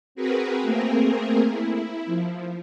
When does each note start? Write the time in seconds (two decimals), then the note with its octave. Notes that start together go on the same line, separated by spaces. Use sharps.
0.15 C4 F#4 G#4 A#4 B4
0.62 A3 A#3 C4 G#4 A#4
1.50 E4
2.06 F3